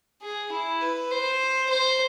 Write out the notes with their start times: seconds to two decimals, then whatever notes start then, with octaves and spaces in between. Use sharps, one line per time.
0.22 G#4
0.52 E4
0.81 B4
1.11 C5
1.69 C5